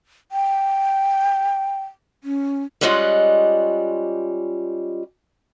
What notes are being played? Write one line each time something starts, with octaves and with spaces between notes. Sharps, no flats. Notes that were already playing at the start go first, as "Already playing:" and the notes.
G5
C#4
G3 G#3 C#4 F4 D#5 F#5